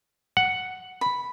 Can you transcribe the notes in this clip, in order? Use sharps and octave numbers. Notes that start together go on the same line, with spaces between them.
F#5
B5